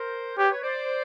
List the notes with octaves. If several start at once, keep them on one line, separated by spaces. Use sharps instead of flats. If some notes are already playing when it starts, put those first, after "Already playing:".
Already playing: A#4 C5
G4 B4 C#5
B4 C#5
C5 D5